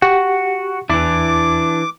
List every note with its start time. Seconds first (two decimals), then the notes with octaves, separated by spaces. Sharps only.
0.02 F#4 G4 F#5
0.90 E2 E3 D4 E4 D6